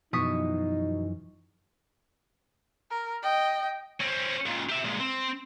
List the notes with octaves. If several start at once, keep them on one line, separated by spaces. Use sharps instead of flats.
F#2 B2 E3 F3 D#4 C#6 D#6 B6
A#4
D#5 G5
C4 C#4
C#2 A#2
G4 E5
A#2 G#3
C4